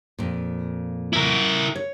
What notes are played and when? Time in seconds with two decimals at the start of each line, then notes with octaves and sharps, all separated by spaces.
0.18 F2 A#2
1.13 E4 A#4
1.76 C#5